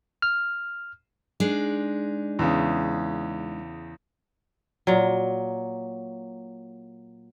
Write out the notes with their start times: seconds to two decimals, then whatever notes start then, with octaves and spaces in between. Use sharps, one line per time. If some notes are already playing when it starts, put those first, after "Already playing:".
0.22 F6
1.40 G#3 D4 D#4
2.39 E2 C#3
4.87 A#2 F#3